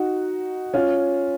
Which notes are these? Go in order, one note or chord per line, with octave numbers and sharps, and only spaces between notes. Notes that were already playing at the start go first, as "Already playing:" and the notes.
Already playing: D#4 F#4
C#4 F4